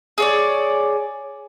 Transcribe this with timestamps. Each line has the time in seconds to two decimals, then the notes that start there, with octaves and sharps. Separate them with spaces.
0.18 G#4 C#5 D5